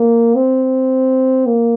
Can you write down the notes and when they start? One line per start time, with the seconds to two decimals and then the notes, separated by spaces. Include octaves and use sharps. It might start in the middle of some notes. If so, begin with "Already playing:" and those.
Already playing: A#3
0.35 C4
1.46 A#3